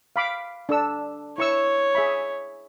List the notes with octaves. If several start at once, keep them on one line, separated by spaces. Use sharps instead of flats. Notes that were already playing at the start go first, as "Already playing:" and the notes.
F5 B5 D6
D4 A4 E6
E4 C#5 C#6 E6
G#4 E5 B5